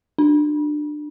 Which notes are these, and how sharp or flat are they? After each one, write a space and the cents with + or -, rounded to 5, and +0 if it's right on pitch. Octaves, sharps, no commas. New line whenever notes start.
D4 +25